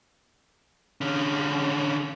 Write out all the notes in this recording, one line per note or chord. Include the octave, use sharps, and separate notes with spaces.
D3 C#4